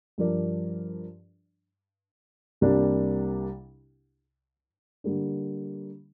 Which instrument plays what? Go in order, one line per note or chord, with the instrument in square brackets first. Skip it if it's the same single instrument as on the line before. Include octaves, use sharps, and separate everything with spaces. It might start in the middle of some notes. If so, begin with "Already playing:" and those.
[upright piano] G2 F3 D4 A#4 D5
C2 C3 G3 A#3 D4
D3 G3 A#3 D4